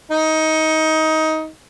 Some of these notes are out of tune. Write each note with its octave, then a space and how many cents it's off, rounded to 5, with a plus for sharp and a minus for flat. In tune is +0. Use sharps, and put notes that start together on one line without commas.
D#4 +20